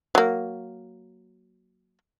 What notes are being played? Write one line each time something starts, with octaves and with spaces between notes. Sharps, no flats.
F#3 A#3